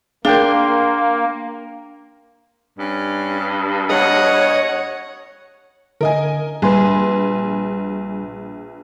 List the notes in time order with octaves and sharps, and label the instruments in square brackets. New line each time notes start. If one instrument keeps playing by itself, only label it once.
[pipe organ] A#3 [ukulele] D4 [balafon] G#4 A#4 [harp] F5 G5 C6
[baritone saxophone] G2 [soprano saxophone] C#4
[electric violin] C#5 [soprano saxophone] D#5 [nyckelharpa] F#5
[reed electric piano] D3 [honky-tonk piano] A#4 D#5 G#5
[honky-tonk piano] A#1 B4 [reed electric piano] G3 G#5 C6